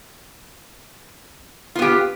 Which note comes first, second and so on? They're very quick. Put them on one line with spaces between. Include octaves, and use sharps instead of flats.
F4 B3 G4